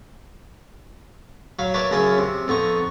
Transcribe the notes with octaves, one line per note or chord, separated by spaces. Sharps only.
F#3 F5 B5
A#4 B4 C#5 D5 E5 A5
F#2 C#3 C#4 E5 B5 D#6
C3
F2 B3 D#4 C#6